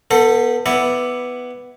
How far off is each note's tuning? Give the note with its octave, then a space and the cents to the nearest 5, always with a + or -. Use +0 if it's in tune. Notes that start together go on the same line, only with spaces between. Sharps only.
B3 -15 A4 +30 C5 +5
B3 +5 E4 +0 D5 +0